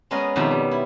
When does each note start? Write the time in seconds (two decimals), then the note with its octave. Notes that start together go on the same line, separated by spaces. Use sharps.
0.11 G#3 B3 C#4 A#4 D#5
0.36 F2 B2 D#3 G4 E5 A#5
0.51 G3
0.71 E4